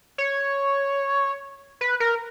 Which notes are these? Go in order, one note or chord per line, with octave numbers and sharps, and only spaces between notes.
C#5
B4
A#4